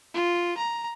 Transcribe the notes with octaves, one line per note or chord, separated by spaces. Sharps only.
F4
A#5